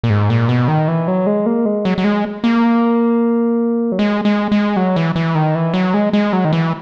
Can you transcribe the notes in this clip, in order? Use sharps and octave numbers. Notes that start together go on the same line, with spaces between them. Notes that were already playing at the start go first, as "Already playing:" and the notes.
A#2
G#2
A#2
B2
D#3
E3
F#3
G#3
A#3
G#3
F#3
F#3
G#3
A#3
F#3
G#3
G#3
G#3
F#3
E3
E3
D#3
E3
F#3
G#3
G#3
F#3
D#3
E3